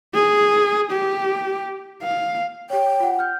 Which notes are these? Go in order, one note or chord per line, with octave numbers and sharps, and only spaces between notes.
G#4
G4
F5
G4 C#5 G5
F4 F#5
F6 G6